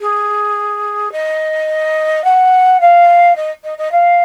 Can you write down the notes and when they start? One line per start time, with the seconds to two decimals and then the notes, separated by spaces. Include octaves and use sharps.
0.01 G#4
1.12 D#5
2.24 F#5
2.81 F5
3.36 D#5
3.64 D#5
3.78 D#5
3.92 F5